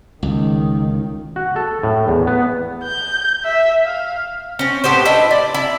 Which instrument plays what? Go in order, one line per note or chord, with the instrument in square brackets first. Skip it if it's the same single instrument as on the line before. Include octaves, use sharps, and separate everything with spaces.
[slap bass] C#2 [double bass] D#3
[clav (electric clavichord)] F#4
A4
A2
E2
B3
[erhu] G6
E5
F5
[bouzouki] C4 C#4
A2 B3 G4 C5
D4 E4 D#5
D5
E4